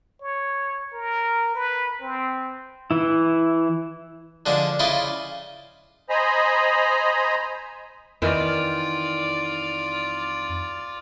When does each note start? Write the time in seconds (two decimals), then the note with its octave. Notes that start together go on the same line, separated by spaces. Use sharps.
0.22 C#5
0.93 A#4
1.55 B4
2.01 C4
2.91 E3 E4
4.46 D3 F3 G#3 D4
4.79 C#3 E4 F4 D5 D#5
6.10 C5 D#5 G#5 A#5 B5
8.22 F2 D#3 E3 F4 D5